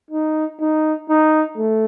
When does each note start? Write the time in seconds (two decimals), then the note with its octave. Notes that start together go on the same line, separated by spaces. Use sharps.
0.11 D#4
0.60 D#4
1.09 D#4
1.57 A3